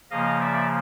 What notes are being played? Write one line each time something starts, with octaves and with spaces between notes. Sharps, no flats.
C#3 F3 A#3 D#5 F5
D5 E5